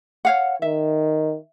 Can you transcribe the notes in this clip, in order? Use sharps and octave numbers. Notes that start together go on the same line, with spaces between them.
C#5 F5 F#5
D#3 E5